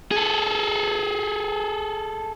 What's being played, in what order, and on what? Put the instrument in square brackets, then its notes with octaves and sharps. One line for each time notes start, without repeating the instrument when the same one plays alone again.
[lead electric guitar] G#4 A4